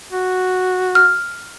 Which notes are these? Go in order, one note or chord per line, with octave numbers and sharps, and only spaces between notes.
F#4
F6